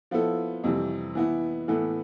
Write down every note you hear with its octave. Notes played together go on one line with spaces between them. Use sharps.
F3 B3 E4 A4
F2 C3 E3 G3
E3 B3 E4
A2 E3 B3 E4 A4